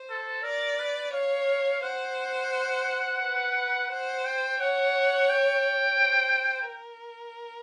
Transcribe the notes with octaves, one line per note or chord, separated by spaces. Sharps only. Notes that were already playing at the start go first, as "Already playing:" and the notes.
Already playing: C5
A4
A#4 D5
B4
C#5 F5
C5 F#5
B4
C5 F#5
G5
C#5 F#5
G5
C5
A#4